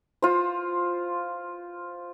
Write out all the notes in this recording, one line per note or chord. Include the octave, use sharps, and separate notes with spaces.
F4 C5